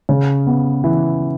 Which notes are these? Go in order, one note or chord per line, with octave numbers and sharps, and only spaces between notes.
C#3
B3
E3